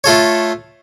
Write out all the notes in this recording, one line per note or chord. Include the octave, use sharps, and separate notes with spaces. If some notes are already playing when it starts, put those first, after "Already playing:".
A3 F4 A4 C#5